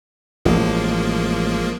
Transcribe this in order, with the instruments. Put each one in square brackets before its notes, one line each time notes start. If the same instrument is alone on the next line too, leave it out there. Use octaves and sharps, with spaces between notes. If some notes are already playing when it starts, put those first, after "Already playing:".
[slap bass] A1 [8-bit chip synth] F3 G#3 A#3